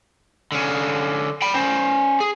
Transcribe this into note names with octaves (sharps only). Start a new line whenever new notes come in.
D3 C#4
G5 B5
C#4 C5
G#4